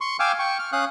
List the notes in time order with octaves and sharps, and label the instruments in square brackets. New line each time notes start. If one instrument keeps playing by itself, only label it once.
[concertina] C6 C#6
F5 G5 G#5 D6 E6 F6
G5 C#6
F6
C#4 F5 D#6 F#6